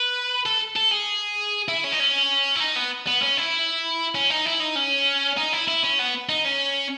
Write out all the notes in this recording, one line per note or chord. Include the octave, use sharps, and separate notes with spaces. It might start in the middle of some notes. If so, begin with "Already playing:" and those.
Already playing: B4
A4
A4
G#4
E4
C#4
D#4
C#4
E4
D#4
B3
B3
C#4
E4
C#4
D#4
E4
D#4
C#4
D#4
E4
E4
C#4
B3
D#4
C#4